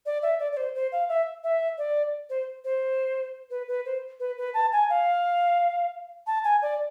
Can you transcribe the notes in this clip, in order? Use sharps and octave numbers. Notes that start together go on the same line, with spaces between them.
D5
E5
D5
D5
C5
C5
F5
E5
E5
D5
C5
C5
B4
B4
C5
B4
B4
A5
G#5
F5
A5
G#5
D5